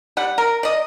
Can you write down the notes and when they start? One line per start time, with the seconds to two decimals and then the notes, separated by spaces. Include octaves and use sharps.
0.17 G3 F#5
0.38 A#4
0.63 D5 D#5